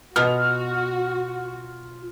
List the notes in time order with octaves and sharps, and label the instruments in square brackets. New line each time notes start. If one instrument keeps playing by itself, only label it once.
[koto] B2 B3 [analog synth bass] F4 [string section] F#4 [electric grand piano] F6